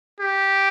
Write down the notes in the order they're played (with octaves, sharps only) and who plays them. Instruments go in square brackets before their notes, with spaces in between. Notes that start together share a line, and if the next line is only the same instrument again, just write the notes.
[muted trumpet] G4